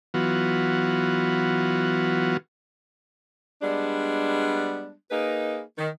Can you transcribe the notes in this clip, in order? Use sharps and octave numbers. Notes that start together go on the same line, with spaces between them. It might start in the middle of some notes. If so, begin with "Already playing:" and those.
E3 F#3 B3 F4 F#4
G3 G#3 B3 D4
A#3 D#4 G#4 A#4 B4
D#3